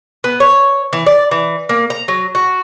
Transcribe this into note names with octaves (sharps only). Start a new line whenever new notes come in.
B3
C#5
E3
D5
E3
A#3
A#5
F#3
F#4